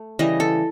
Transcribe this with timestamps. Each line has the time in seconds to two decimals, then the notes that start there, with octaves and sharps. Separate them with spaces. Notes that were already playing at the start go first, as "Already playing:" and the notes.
Already playing: A3
0.19 C#3 E3 G3 D#5
0.40 A4